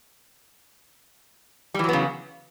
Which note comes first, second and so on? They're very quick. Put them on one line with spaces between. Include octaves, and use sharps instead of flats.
G3 E3 F#3 B3 C#3